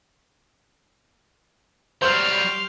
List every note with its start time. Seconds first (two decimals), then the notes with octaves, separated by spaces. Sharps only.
2.02 F#3 G3 G4 C5 F5 F6 G6 F7